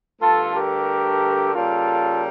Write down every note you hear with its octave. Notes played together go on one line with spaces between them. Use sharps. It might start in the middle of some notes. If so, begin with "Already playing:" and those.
G2 D3 A3 F4 A4
G4 A#4
C#3 G3 A#3 F4 A4